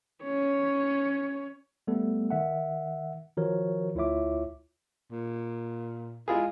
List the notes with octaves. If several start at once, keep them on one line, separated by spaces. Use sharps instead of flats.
C#4 C#5
G3 A3 B3 A4
D#3 E5 F#5
D#3 F3 F#4 A#4 C#5
D2 E4 F4 C#5 E5 D6
A#2
G#3 E4 F4 G#4